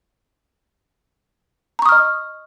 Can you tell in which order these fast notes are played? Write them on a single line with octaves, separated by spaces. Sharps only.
A#5 C#6 D#6 F6 D#5